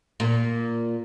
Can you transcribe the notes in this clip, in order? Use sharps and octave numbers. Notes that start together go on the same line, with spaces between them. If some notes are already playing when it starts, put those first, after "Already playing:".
A#2